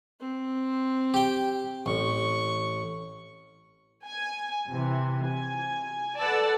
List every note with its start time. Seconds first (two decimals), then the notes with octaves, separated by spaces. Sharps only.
0.21 C4
1.14 G4 G5
1.86 A1 C#6
4.07 G#5
4.69 C3 E3
5.27 G#5
6.20 A4 B4 D5 F#5 A5 E6